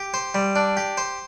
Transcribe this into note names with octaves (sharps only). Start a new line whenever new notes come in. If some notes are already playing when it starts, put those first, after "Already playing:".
Already playing: G4
C5
G3
D4
G4
C5